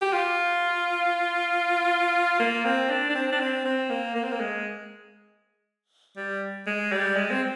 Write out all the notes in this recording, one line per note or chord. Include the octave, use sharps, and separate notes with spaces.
G4
F4
A#3
C4
D4
D4
C4
D4
C4
C4
A#3
A#3
C4
A#3
G#3
G3
G#3
G3
G#3
C4